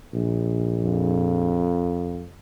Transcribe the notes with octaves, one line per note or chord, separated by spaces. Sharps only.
A#1
F2